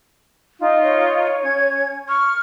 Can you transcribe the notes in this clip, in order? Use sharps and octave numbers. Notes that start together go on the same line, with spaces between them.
D#4 F4
C#5
C#4 G#6
C#6 F6